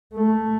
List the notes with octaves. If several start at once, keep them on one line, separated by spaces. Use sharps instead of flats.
A3